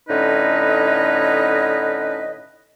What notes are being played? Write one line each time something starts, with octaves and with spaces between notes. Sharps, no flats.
A2 D3 C#4 D#4 B4 D#5